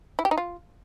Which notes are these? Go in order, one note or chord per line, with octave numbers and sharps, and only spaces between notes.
E4
G4
D#4
F4